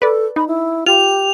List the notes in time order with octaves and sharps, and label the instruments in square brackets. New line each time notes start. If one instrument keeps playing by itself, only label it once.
[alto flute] A4 [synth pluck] B4 D5
[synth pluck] D#4 [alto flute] B5
[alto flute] E4
[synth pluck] F4 [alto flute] G4 [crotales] F7